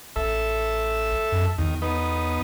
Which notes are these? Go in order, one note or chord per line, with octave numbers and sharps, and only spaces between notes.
A1 A4 E5
F#2
E2 D#3
B3 D#4